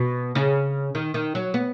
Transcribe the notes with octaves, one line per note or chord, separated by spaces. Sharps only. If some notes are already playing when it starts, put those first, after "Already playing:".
Already playing: B2
C#3
D#3
D#3
F#3
B3